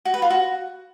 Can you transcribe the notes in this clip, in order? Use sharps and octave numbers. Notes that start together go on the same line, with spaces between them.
F#4
B4
F4
F#4